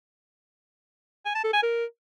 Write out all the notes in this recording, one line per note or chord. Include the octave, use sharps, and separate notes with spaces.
G#5
A5
A4
G#5
A#4